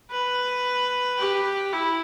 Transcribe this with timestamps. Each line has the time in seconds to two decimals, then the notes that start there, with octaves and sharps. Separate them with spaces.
0.11 B4
1.19 G4
1.73 E4